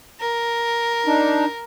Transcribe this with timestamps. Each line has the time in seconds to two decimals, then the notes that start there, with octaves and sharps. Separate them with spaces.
0.20 A#4
1.06 D4 D#4